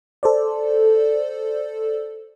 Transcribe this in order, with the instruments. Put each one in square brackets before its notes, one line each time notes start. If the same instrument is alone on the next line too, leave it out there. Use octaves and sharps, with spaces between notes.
[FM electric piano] A4 C5 D5